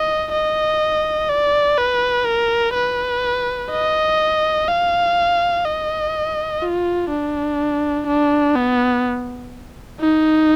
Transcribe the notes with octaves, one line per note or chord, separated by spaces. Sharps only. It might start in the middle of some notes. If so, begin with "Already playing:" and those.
Already playing: D#5
D#5
D5
B4
A#4
B4
D#5
F5
D#5
F4
D4
D4
B3
D#4